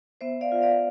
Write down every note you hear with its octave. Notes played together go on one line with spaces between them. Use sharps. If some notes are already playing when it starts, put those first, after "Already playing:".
B3 C5 E5
D5 F5
F4
D5 F5